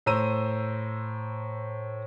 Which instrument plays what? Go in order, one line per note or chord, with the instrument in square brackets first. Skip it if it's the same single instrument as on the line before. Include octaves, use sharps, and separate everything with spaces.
[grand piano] A2 C5 A#5 E6 D#7